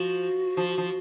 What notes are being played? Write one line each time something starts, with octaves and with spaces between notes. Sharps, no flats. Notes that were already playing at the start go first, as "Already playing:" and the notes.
Already playing: F3 F#4
F3
F3